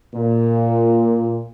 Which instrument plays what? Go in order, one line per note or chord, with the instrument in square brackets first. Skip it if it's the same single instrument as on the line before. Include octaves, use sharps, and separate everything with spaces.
[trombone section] A#2